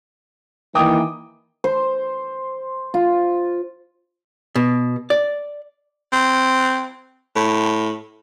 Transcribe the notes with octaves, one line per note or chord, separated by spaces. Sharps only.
D#3 E3 A#3 G5 D6 D#6
C5
F4
B2
D5
C4
A2